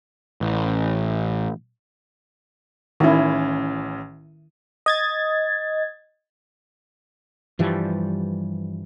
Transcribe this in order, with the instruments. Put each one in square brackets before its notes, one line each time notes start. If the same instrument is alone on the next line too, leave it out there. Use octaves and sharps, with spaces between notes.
[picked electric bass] A1
[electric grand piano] A1 C#4 [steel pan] D#3 E4
[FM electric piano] D#5 G#6 A6
[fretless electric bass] G2 E3 F3 G3